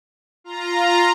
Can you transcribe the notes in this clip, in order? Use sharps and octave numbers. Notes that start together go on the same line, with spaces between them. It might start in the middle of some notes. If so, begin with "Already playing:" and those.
F4 A#5